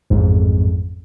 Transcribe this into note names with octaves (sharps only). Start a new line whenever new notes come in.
A1 F2 G#2